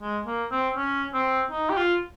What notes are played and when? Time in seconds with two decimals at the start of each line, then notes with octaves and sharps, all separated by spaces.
0.01 G#3
0.26 A#3
0.51 C4
0.77 C#4
1.14 C4
1.51 D#4
1.69 G4
1.77 F4